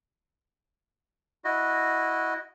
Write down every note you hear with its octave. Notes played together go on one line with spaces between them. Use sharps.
E4 F#4 D#5